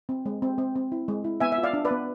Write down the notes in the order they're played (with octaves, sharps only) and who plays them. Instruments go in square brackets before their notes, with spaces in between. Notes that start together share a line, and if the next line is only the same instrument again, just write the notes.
[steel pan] C4
G#3
C4
C4
C4
E4
G#3
E4
B3 E5 G#5
E5
F4
D5 F5
D4
B4 D5
B3